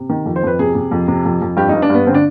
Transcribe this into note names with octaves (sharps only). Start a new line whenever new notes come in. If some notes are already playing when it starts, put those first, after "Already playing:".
Already playing: C3
D#3
F2
C5
F2 B4
C3 G#4
C3
F2
C3
F2
F2
G2 G4
G2 D#4
D4
G2 B3
D3 C4
D4